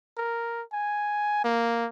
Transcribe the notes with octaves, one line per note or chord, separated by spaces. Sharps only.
A#4
G#5
A#3